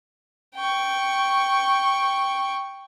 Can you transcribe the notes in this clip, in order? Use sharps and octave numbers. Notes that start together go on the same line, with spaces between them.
G5 C#6